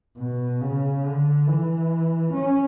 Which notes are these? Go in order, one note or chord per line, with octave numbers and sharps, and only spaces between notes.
B2
C#3
D3
E3
C#4